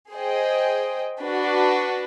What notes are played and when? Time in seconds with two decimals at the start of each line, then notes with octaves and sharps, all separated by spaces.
0.12 G#4 C5 D#5 G5
1.22 D4 F#4 B4